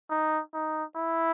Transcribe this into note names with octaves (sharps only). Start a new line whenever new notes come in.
D#4
D#4
E4